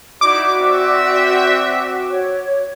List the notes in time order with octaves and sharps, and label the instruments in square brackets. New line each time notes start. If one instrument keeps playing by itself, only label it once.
[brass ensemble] D#4 E4 [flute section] F#4 [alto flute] D5 [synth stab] D6
[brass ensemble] C4 E5
[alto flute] C#5